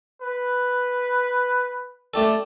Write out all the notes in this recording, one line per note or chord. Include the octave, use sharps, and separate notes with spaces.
B4
A3 G4 A4 D5